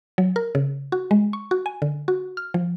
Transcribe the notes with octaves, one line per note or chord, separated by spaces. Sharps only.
F#3
A#4
C#3
F#4
G#3
C#6
F#4
G#5
D3
F#4
F6
F3